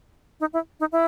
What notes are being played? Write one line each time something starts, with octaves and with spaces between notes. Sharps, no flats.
D#4
E4
D#4
E4